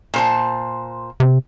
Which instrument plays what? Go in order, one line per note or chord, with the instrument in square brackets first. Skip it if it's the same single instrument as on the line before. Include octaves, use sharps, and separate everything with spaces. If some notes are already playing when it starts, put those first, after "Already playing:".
[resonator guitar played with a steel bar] A#2 C5 A5
[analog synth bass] C3